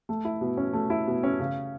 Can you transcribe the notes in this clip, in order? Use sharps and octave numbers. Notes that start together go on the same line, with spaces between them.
A3
E4
B2
C#4
A3
E4
B2
C#4
C#3